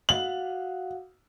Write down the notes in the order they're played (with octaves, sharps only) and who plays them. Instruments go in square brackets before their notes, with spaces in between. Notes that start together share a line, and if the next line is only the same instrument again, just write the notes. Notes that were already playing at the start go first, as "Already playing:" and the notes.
[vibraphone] F#4 F5 F#5 [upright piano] F#7